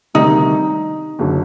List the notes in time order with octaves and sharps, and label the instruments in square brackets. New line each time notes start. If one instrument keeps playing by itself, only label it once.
[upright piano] D2 C3 D#3 G3 [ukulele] D#4
[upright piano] F#1 D3 F#3